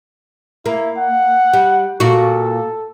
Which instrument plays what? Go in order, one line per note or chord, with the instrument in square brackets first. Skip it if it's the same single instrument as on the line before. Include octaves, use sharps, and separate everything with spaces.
[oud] A#3 [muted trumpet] E4
[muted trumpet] F#5
[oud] G3
[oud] A#2 F#4 [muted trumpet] A4